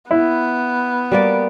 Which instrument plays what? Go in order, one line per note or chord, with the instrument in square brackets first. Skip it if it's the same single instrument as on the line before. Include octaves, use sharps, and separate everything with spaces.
[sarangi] B3 [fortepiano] E4
[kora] G3 A#3 D5